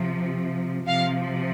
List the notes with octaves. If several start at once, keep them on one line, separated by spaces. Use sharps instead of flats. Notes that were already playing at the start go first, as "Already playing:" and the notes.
Already playing: C3 F3
C3 F3 F5